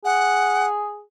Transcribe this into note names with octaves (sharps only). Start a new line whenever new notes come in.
G#4 F#5